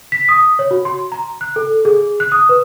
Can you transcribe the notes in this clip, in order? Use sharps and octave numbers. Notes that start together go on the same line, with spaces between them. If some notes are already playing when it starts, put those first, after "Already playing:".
B6
D#6
C#5
F#4
C6
A#5
F#6
A4
G#4
F#6
D#6
B4